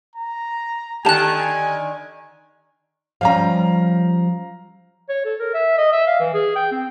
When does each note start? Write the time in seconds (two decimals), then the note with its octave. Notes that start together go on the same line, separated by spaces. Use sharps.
0.15 A#5
1.05 D3 D#3 G4 G#5 A5 F#6 F7
3.21 F3 G3 C#4 F5 A#5
5.09 C#5
5.25 A4
5.40 A#4
5.54 E5
5.78 D#5
5.92 E5
6.07 F5
6.20 E3
6.34 G#4
6.56 G5
6.71 C4